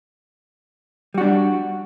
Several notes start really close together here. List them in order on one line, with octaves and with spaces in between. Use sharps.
G3 F#4 D4